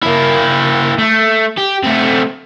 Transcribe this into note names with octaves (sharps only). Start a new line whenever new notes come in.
A#3 E4
A3
G4
A3 C4